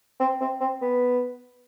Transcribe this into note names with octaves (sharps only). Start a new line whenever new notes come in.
C4
C4
C4
B3